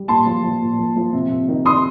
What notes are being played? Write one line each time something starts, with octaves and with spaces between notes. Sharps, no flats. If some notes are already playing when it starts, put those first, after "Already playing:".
Already playing: G3
A#2 A5 C6
F3
F3
A#2
F3
F3
C3
C3
D#3
D#3 C6 D#6